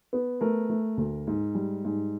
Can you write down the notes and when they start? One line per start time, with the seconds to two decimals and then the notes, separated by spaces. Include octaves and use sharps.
0.13 B3
0.41 A3 A#4
0.70 A3
0.97 D2
1.27 G#2
1.55 G3
1.85 G#2